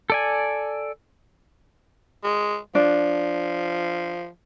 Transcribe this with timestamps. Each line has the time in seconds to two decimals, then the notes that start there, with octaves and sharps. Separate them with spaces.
0.10 A4 D5 G#5
2.24 G#3
2.75 F3 D4